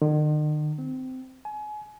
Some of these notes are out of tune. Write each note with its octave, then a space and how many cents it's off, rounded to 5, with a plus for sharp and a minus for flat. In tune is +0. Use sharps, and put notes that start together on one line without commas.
D#3 -45
C4 -20
G#5 +30